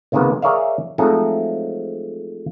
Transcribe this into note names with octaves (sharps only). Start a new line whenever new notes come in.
C#2 C3 D#3 G#3 A#3 B3
G#4 A#4 C#5 D5 E5 F5
F3 F#3 G#3 A3 C4 D#4